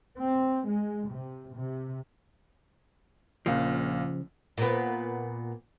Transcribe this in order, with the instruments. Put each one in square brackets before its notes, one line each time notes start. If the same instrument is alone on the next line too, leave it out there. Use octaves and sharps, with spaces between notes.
[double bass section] C4
G#3
C3
C3
[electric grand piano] A#1 A#3 F5 [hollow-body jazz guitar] C#3 F3
[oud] A#2 B3